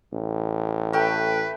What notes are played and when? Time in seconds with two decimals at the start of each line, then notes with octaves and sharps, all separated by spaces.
0.13 A1
0.93 A3 B4 G5